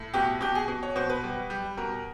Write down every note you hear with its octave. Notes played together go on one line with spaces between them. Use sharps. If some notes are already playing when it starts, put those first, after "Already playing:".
Already playing: A2
B2 G4
B2 G4
G#4
B2
C#5
B2 C5
B4
G3
G3
B2 A#4